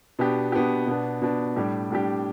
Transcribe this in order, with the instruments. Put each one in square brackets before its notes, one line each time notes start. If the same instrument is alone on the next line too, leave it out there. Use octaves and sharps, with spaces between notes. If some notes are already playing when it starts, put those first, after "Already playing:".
[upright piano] B2 B3 D4 G4
B2 B3 D4 G4
B2 B3 D4
B2 B3 D4
A2 G3 D4 G4
A2 G3 D4 G4